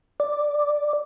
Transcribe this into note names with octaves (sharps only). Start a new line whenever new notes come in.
D5